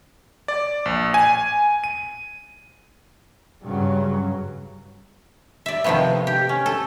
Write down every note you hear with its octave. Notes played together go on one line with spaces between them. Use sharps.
D5
A#1
G#5
D#7
G2 C#3 F#3
D5 E5
C3 D#3 F3 A3 B3
G4
C#4
A4